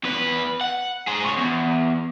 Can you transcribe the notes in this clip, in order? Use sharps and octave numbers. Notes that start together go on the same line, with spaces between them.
E2 B4
F#5
G#4 C5
C#2 C#5
E2